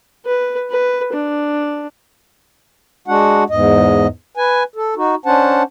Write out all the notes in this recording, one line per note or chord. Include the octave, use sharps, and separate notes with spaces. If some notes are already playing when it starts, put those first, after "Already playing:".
B4
B4
D4
G#3 D4 F#4 F#5
E2 G#2 D#5
B4 G#5
A4
D#4 F#4
C#4 D4 C5 F#5 A5